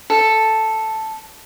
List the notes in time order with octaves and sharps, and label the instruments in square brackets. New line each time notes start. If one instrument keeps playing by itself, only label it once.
[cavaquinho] A4